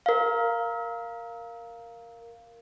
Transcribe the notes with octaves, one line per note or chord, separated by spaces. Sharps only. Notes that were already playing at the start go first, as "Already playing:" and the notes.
A#4 F5